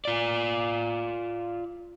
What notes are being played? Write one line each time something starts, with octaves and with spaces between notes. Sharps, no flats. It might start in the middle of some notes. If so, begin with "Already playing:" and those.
F4 D5